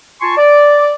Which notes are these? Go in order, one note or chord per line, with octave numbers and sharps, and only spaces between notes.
F4 G#5 A5 C6 C#6
D5